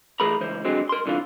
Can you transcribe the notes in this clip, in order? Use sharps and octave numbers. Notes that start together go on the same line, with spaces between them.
E3 A3 G#4 A#4 A#5 B5
C#2 E3 C5
D3 F#3 G#3 C4
A#4 C6
C2 D3 E3 F4